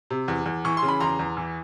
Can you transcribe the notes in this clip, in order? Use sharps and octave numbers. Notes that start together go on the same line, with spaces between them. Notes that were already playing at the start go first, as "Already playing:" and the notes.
C3
E2
E2
E3 C#6
C6
C#3
B5
E2 A#5 C6
E2
E3